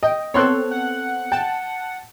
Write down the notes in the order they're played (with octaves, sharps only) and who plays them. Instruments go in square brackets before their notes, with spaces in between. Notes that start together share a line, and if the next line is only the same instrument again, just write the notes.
[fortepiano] D#5 [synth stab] G5
[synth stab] B3 C4 A4 [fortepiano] C#5 C6 F#6
[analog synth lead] F#5
[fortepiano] G5 [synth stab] A5